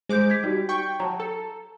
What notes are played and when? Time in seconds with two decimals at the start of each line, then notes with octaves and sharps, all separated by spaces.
0.09 G#3 C5 D6 G6
0.30 G#6 B6
0.43 G3 D#4 F#4 G4
0.69 G5 C#6
1.00 F#3 A5 A#5
1.20 A4